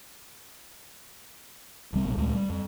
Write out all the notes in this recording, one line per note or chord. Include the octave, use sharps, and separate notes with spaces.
D1 C2 G3 C4
A#1 B2
D2 A#2 G#3 A3
G3
F2